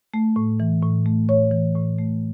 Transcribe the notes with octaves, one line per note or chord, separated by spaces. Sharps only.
A3
A2
E3
A2
A3
A2 C#5
E3
A2
A3